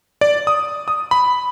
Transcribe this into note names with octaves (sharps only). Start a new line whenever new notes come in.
D5
D#6
D#6
B5